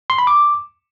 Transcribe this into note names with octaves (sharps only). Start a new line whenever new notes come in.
C6
B5
D6